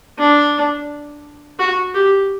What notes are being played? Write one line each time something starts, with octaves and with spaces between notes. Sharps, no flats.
D4
F#4
G4